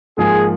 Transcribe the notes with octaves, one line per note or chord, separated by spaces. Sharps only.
G#2 F3 A#3 G#4